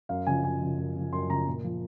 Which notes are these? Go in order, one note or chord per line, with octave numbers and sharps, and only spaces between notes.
F#2 F5
C#3 F3 G#5
F#2 G#5
C#3 F3
F#2
C#3 F3
F#2 C6
C#3 F3 A#5
A#2
F3